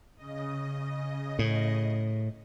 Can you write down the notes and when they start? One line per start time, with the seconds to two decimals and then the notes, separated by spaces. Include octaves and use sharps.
0.15 C#3 D#5
1.39 A2